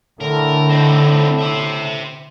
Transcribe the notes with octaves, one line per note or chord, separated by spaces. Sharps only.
A2 D3 A#4
C4 D#4
C5 E5